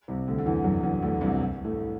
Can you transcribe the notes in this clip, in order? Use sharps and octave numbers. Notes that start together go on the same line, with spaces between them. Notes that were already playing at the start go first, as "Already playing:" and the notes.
C2 C3
D2 D3
D3
E2 E3
F#2 F#3
E2 E3
D2 D3
C2 C3
A2 A3